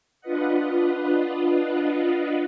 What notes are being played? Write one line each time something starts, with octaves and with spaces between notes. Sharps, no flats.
D4 F4 B4 D#5 F#5